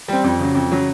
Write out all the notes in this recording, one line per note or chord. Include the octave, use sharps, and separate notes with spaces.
G3 C4
F2
C#3 F#3
F2
C#3 F#3